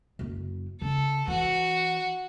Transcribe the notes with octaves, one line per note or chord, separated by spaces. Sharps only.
F#1 F#2
C#3 A4
E3 F#4